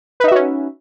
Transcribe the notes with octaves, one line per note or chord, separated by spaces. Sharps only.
C#4 D#4 F#4 B4 E5